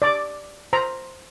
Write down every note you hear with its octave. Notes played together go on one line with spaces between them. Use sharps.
D5 D6
C5 A#5